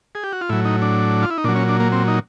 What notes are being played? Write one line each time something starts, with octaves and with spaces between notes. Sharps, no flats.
G#4
G4
F#4
F4
A2 F#3 E4
D#4
D4
F4
E4
D#4
A#2 F#3 D4
C#4
D4
A#3
C4
D#4